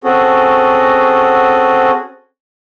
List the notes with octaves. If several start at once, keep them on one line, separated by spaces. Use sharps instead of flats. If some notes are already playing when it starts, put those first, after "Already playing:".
C4 C#4 F#4 G#4 A4